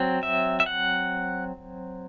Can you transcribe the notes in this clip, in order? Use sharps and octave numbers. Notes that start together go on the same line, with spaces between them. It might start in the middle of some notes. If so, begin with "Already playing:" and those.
Already playing: F#3 C4
E5
E5
F#5